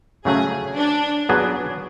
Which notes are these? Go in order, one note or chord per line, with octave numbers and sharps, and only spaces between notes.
C#3 F#3 A3 C#4 G#4
D4
F#3 B3 D4 G#4 B4